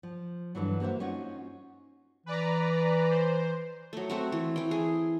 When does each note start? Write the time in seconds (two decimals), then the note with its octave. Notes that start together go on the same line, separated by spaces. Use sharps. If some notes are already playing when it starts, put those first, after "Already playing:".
0.03 F3
0.55 G2 B2 D3 E3 F#3
0.80 A#3 F#4 A4 C5 E5
1.00 C#4 D#4 F4 F#4
2.26 E3 B4 D5 A#5
3.10 C5
3.93 F#3 A3
4.10 A3 C4 F#4
4.32 E3
4.56 E3 G5
4.71 G#4